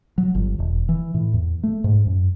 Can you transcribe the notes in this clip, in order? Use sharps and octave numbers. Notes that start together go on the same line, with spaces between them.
F#3
G1
E1
E3
A2
E2
A3
G#2
F#2